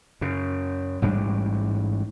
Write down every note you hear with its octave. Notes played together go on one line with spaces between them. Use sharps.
F#2 C#3
A1 G#2 G3 D4